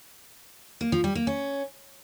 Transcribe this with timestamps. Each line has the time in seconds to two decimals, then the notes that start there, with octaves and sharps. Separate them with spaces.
0.81 A#3
0.92 F3
1.04 G3
1.15 A#3
1.27 C#4